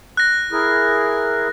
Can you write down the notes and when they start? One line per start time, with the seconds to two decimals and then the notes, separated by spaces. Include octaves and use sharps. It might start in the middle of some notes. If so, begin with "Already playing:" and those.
0.17 F#6 A#6
0.52 E4 G#4 A#4